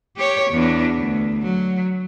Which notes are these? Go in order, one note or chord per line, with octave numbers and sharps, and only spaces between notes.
G4 C#5
E2 D4
D2
F#3